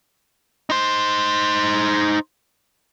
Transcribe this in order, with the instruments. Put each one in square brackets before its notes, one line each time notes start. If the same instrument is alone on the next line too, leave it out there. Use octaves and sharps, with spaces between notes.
[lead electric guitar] D#4 C5